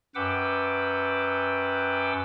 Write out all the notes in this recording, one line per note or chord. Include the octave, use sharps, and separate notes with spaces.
F#2 B4 F#5 G5 D6 E6